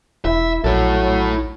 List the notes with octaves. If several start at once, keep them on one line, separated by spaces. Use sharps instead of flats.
E1 E4 E5
A#1 F#3 E4 A4